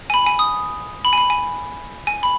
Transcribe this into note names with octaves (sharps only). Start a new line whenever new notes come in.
G#5
B5
G#5
D#6
B5
G#5
B5
G#5
G#5
B5